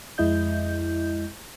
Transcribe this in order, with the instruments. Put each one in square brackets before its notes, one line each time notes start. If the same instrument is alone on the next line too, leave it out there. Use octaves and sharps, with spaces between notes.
[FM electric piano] F2 G#3 E4 D#5 G6